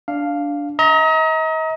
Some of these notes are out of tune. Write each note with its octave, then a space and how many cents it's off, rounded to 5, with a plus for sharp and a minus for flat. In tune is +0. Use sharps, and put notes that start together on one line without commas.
D4 -10 F5 +0
D#5 +40 A#5 +0